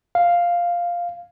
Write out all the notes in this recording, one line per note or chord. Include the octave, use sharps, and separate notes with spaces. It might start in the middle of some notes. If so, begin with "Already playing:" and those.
F5